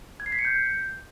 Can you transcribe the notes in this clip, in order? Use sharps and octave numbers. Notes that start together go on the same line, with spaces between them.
G#6
C7
B6
C#7
G6